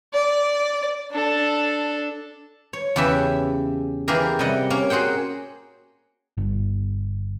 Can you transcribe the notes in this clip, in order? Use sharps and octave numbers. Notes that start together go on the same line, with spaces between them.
D5
D4 A4
C#5
E2 C#3 G4 B4 E5
E3 A#3 G4 G#4 A#4
C3 G3 D#5 F#5
A#3 C#4
F#4 G#4 C5 F#5 G5
G1